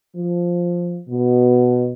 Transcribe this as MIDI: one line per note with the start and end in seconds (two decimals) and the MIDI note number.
0.16 0.99 53
1.09 1.93 47